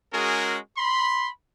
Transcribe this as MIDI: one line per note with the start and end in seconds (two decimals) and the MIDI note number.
0.13 0.58 56
0.13 0.58 61
0.13 0.58 66
0.13 0.58 68
0.13 0.58 70
0.78 1.29 83
0.78 1.29 84